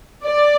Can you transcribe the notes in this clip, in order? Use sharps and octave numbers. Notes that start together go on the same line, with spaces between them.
D5